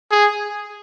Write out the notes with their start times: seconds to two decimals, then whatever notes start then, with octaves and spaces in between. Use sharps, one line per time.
0.11 G#4